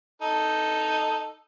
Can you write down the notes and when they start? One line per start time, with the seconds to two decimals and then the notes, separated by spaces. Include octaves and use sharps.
0.22 D#4 A4